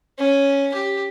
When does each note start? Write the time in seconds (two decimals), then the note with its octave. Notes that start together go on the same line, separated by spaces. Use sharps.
0.19 C#4
0.74 G4